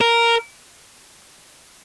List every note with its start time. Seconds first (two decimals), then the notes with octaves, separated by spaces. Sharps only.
0.01 A#4